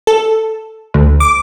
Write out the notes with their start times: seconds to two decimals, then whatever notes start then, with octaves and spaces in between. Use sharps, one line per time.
0.07 A4
0.94 D2
1.20 D6